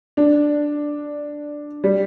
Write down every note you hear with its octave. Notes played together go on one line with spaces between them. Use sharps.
D4
G3